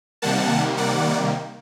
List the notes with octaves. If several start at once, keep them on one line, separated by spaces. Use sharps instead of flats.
C3 D#3 G3 A#3 F#5 A5
D5 F#5